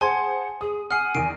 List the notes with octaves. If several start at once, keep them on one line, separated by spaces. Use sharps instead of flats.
G#4 C5 F#5 G#5 A5 C6 G#6
G#4 D#6
F#5 G#5 D#6 F6 C7
E2 D#3 C7 D7